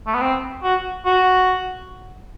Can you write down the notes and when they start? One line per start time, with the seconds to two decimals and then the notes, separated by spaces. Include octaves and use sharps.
0.07 A3
0.14 B3
0.21 C4
0.63 F#4
1.05 F#4